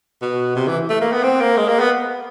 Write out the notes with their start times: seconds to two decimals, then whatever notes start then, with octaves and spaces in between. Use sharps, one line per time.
0.22 B2
0.56 C3
0.67 E3
0.89 A3
1.01 A#3
1.12 B3
1.23 C4
1.41 A#3
1.57 G#3
1.68 A#3
1.80 B3